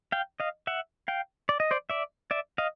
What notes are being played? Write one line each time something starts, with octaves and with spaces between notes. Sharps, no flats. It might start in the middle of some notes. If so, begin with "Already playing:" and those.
F5 G5
D#5 F5
E5 F#5
F5 G5
D5
D#5
C5 D5
D5 E5
D5 E5
D#5 F5